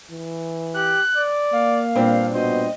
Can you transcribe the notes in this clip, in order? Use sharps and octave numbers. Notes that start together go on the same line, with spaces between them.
E3
G4 F#6
D5
A#3 F5
G2 A#2 C4 D4
B2 C5 D#5